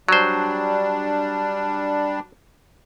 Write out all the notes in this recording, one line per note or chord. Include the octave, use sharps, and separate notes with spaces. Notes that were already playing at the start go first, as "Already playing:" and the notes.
F#3 G3 D4 C5